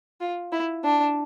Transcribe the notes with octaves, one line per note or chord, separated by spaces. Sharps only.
F4
E4
D4